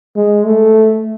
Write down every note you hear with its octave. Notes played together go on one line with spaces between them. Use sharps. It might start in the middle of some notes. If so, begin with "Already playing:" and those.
G#3
A3